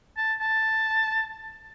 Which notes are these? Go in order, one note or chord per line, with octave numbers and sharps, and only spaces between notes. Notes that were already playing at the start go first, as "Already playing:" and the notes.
A5
A5